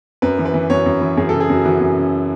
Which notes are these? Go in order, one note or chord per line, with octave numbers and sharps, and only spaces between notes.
F#2 B4
E3
B4
E3
F#2 C#5
F#2
E3
F#2 G#4
A4
C#3
G#4
F#2 F#4
E3 F#4
F#2
C#3